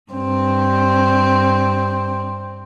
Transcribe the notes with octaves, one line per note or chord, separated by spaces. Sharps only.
G2 C4